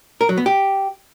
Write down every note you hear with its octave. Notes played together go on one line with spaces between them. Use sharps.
A#4
F#3
B3
G4